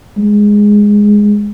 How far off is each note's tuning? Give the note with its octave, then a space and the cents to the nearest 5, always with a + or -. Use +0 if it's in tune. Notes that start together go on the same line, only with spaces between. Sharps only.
G#3 -5